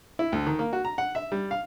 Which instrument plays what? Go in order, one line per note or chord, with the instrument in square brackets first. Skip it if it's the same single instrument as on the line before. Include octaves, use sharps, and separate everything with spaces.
[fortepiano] E4
D2
D#3
A#3
F#4
A#5
F#5
E5
G3
F5